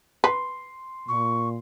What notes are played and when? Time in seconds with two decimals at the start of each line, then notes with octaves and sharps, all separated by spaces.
0.24 B4 C6
1.08 A#2 C#6